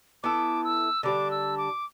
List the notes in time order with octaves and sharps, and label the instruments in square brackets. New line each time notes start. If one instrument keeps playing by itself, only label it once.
[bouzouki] B3 E4 A4 [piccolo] D6
[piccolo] E6
[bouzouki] D3 G3 D4 [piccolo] D6
[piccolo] E6
D6